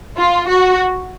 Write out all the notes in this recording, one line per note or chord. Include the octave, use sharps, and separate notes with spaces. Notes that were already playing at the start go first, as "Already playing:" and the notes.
F4
F#4